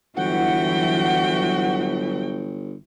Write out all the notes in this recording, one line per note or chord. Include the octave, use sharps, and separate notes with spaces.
G1 E3 F#3 F#4 F#5 G5